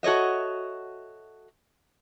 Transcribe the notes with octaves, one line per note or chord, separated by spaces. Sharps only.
F#4 A4 C#5 D#5 E5